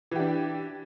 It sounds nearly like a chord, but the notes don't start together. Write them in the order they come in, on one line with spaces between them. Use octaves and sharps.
E3 G4 D4